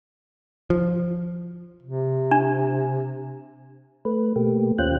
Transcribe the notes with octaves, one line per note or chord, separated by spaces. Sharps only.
F3
C3
D4
A3 B4
B2 A3 A#3 G4
D#2 C#4 F4 C5 G5 F#6